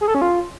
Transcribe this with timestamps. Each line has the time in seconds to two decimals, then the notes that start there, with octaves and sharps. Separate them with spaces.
0.01 G#4
0.08 A4
0.15 C#4
0.21 F4